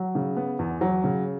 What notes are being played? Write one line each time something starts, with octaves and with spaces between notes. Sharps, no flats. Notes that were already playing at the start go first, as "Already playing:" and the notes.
Already playing: F#3
C#3
B3
E2
F#3
C#3